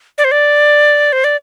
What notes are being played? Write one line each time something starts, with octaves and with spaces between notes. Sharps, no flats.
D5
C5
D5
C5
D5